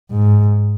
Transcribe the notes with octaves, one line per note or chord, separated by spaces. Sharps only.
G#2